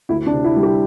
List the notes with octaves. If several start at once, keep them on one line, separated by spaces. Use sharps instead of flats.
D2 E4
D4
C3
E4
G3
G4